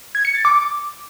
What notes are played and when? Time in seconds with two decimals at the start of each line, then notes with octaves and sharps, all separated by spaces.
0.15 G#6
0.25 C#7
0.35 A6
0.45 D6